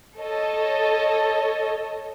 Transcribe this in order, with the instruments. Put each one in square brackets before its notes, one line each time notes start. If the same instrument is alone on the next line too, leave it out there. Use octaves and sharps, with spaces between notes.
[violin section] A4 C#5 D#5